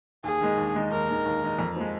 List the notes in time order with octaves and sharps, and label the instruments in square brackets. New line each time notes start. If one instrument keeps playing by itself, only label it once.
[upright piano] D#2 [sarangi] G#4
[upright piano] D#3 G#3 D#4
D#2
D#3 G#3 D#4
[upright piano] D#2 [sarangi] A#4
[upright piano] D#3 G#3 D#4
D#2
D#3 G#3 D#4
F2
F3 G#3